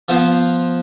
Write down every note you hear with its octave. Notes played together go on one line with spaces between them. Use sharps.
F3 B3 F4 C5